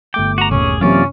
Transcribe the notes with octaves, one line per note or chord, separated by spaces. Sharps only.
G1 A3 G5 D6
F#4 A#5
D#2 A#2 D3 C#4 G#4
F#2 C3 E3 F#3 A#3 C#4 F4 D5